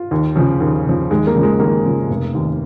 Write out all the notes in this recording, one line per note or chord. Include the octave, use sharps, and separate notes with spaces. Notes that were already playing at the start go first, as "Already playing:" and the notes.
Already playing: F4
D#2
C#3 F3
D#2
C#3 F3
D#2 G#3
A#3
C#3 F3
G#3
D#2 A#3
C#3 F3
F1
D#2 D#3